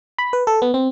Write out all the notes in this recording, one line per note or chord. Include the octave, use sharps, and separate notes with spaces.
B5
B4
A4
B3
C4